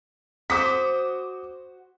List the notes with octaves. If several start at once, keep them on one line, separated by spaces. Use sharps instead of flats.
F#4 C5 D6 D#6 B6